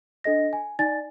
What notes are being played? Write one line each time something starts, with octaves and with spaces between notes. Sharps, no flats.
D4 A4 D#5 A#6
G#5
D#4 D5 G#5 A6